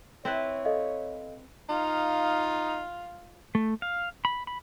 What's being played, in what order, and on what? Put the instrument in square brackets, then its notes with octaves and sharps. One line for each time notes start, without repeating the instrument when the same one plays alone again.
[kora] C4 E4 B4 [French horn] C#5
[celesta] A4 D#5 F5
[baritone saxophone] D#4 [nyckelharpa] F4 F5
[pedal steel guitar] A3
F5
B5
B5